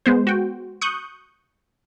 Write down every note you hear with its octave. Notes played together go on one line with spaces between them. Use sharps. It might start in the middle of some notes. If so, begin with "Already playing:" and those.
G#3 B3 C5
F#4 G5
C#6 D#6 F#6 G6